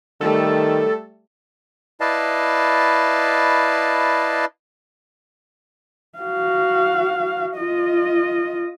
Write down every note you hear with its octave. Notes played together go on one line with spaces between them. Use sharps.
D#3 G3 A3 A4
E4 B4 D5 D#5 F5 A5
F#4 F5
F4 D#5